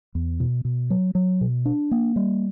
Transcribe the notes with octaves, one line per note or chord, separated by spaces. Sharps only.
E2
B2
B2
F#3
F#3
B2
D4
A#3
G3